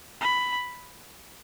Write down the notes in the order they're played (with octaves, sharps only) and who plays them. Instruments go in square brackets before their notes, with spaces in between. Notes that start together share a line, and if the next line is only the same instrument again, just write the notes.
[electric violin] B5